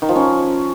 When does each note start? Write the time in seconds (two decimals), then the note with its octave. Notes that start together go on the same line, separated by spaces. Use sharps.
0.02 D#3
0.09 F3
0.16 C#4